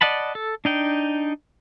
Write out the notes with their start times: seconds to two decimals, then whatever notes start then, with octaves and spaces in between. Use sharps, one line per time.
0.01 D5 D#5 F#5 A5 B5
0.35 A4
0.65 D4 D#4 G5